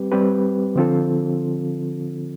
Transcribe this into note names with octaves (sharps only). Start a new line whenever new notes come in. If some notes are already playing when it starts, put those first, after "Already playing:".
Already playing: G3 C4 G4 B4
G3 C4 G4 B4
D3 F3 C4 F4 A4